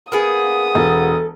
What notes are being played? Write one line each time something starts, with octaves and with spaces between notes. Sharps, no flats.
A#3 B3 G#4 D#6
E1 A4